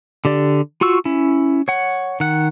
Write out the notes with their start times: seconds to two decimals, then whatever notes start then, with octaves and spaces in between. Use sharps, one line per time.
0.25 D3 G4 D5
0.81 F4 F#4 C#6 E6
1.05 C#4 E4
1.68 C#5 F#5
2.20 D#3 F#5